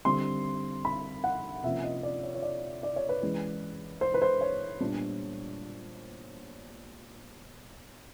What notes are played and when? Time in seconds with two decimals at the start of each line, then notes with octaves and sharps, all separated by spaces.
0.05 D3 G3 C4 C6
0.85 B5
1.24 F#5
1.63 C3 F3 A#3 C#4 E5
1.84 D#5
2.03 D5
2.23 C#5
2.35 C#5
2.42 D5
2.83 D5
2.96 C#5
3.09 B4
3.22 E3 G#3 C#4
4.01 C5
4.14 B4
4.22 C5
4.41 C#5
4.80 A#2 G3 B3 D4